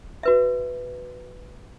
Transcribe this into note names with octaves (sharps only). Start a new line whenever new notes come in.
F#4 B4 E5